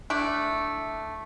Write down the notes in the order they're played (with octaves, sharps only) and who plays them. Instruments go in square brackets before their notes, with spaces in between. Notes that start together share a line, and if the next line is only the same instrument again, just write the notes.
[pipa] A3 D4 E4